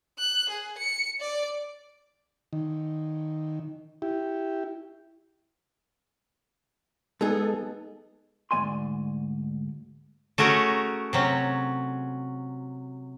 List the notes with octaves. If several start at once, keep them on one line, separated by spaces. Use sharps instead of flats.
F#6
G#4
C#7
D5
D#3
E4 G4
G#3 B3 D#4 G#4 A4
D2 G#2 F#3 D5 G#5 C6
A3 C#4 F#4 G#4 A#4
C3 F#3 C#4